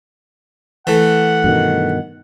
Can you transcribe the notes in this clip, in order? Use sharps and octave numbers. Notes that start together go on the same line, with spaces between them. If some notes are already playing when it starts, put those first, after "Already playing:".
E3 A3 F#5
G2 B2 D#3